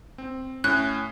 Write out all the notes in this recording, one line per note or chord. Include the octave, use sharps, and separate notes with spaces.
C4
A2 C#4 F#6